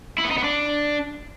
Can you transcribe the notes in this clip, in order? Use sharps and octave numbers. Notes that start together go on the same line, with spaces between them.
E4
B3
D#4
B3
D4